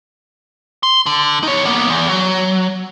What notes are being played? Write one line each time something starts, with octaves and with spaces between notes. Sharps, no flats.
C6
D3
D#4 C#5
A#3 B3
E2
F#3